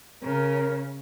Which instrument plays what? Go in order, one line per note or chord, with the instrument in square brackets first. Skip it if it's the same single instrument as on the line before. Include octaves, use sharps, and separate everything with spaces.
[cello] C#3 [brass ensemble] A#4